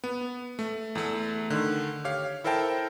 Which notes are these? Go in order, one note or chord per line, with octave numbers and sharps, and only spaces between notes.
B3
A3
E2 A3
D3 D#3
G4 C#5 F5
E4 A4 A#4 C5 G5 A5